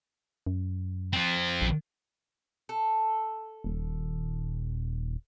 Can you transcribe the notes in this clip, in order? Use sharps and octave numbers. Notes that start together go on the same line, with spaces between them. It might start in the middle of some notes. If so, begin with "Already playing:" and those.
F#2
F3 C4
A#1
A4
D#1